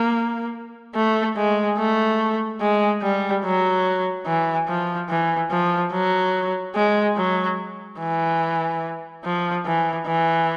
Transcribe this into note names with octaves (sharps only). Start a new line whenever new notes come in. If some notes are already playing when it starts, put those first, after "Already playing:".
Already playing: A#3
A3
G#3
A3
G#3
G3
F#3
E3
F3
E3
F3
F#3
G#3
F#3
E3
F3
E3
E3